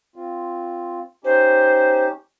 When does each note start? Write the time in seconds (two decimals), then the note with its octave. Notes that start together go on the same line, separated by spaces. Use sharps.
0.16 C4 F4
1.24 C#4 D#4 G4 C5